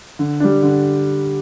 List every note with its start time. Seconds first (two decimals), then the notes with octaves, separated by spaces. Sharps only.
0.19 D3
0.40 G3 D4
0.63 D3